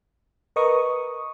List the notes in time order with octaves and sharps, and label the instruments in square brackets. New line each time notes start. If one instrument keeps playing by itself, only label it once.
[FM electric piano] A#4 B4 D#5 C#6 D#6